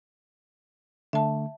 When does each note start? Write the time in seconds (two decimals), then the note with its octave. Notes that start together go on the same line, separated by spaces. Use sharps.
1.13 D3 A3 E5 A5